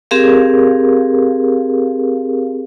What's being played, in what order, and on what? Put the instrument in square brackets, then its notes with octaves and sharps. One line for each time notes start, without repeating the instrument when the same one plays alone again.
[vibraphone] C4 G4 G#4 A#4 F5